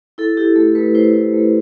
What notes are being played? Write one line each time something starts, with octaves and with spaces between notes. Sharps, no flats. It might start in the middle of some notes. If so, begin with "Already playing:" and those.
E4 A4
E4 G4
A3 A4
A3 B4
E4 C5
E4
A3